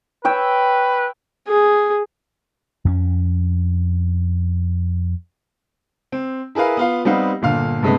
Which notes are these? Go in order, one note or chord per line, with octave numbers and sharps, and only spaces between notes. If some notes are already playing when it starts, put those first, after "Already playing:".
B4 C#5 G5 E6
G#4
F2 B3 C#4
C4
E4 G#4 A#4 B4 F5
B3 F4 F5
G3 B3 C4 D#4 F5 F#5
G1 A#2 D3 F5 F6
G2 C3 G#3 A3 B3 C4